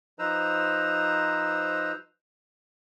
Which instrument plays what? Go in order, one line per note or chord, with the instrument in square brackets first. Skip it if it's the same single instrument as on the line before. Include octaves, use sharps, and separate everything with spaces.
[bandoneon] F3 D#4 B4 C5 A#5 E6